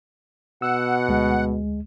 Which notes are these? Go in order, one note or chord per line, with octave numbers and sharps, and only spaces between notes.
B2 F#5 E6
D2 G#3